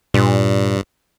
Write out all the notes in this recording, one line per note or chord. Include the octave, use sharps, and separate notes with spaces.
G2 A#2